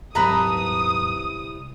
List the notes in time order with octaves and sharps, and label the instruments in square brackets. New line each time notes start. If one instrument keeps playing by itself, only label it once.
[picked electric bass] D#1 G#2 F#3 [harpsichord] C2 [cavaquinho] B4 A5 A#5 [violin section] D#6